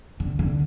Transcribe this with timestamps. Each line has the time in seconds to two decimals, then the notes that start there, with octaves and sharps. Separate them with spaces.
0.20 D3
0.39 D3